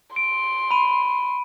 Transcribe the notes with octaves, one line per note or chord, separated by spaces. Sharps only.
C6 D7
B5 D#7